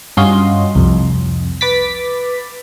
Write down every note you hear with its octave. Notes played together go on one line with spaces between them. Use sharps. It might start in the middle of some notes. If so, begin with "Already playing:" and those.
G2 C#4 F4 F#4 D#5 C6
C2 F2
B4 D6 A6 B6